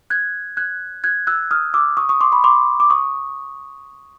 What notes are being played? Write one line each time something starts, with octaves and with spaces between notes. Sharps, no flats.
F#6 G#6
F#6 G#6
F#6 G#6
E6 F#6
D#6 F6
D6 E6
C#6 D#6
C#6 D#6
C6 D6
B5 C#6
C6 D6
D6
C#6 D#6